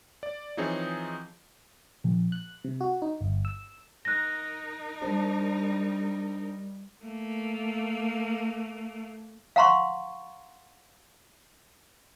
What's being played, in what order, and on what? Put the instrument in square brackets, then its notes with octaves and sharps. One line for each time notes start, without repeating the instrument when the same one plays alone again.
[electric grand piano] D5
E3 F3 C4 D#4 G#4 C#5
[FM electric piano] A#1
F#6
C3
F#4
D#4
G1
E6
[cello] D#4 A#4 [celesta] F#6 A#6
[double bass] G3 [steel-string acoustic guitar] D4 C5
[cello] A3 A#3
[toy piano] F5 F#5 A#5 C6 C#6